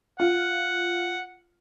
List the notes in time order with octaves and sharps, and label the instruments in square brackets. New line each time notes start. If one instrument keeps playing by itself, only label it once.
[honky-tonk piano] F4 [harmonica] F#5